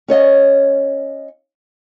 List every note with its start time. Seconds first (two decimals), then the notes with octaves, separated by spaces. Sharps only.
0.08 C#4 C#5 D#5 F5